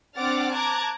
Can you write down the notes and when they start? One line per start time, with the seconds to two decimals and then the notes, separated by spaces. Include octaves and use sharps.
0.17 C4 D4 F#5 D6 F6 A6
0.54 A5 A#5 D6 F#6 G#6